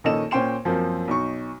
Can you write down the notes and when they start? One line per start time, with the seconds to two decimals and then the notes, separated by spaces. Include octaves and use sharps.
0.04 A#1 D#3 C#4 A4 D#5 E7
0.31 A#2 C#4 C5 G5 C6 E7
0.65 F#2 F3 A#3 C4
1.08 B1 D#4 C#6